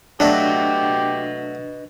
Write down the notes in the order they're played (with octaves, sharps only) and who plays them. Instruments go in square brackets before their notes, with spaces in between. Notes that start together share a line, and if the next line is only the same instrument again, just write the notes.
[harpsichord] F#3 A3 [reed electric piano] D4 [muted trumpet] G4 [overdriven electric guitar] B4 D#5